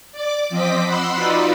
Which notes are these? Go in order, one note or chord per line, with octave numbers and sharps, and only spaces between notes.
D5 D6
F3 C4 D#5 D6 B6
F#5 B5 C6 E6
D#4 F4 F#4 B4 D5